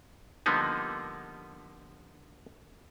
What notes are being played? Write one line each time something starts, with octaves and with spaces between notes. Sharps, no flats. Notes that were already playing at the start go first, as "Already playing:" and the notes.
D3 F3 G3 A#3 B3 D#4